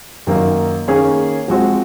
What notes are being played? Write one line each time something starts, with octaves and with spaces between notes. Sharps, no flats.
F#2 D#3 A#3 D#4
D#3 A#3 C#4 G#4 C#5
F3 G#3 C4 F#4